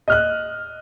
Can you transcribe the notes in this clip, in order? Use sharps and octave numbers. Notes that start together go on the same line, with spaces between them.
D#5 F6 F#6